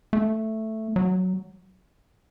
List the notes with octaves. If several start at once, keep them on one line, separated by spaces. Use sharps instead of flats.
A3
F#3